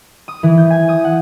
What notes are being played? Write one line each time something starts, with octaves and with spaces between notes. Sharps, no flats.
D#6
E3
G6
G#5
D#6
F#5